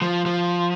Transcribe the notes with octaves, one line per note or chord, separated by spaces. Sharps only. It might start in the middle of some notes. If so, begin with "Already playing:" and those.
F3
F3